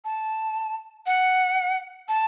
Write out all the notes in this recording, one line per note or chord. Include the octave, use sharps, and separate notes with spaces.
A5
F#5
A5